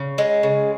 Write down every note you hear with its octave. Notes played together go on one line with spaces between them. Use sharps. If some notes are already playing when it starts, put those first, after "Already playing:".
Already playing: C#3
G#3
C#3